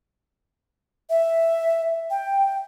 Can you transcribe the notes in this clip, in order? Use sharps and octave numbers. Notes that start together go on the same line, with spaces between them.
E5
G5